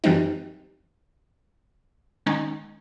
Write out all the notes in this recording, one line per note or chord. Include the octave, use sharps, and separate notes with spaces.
F#2 E3 G3 C4 D#4
D#3 G#3 C#4 D#4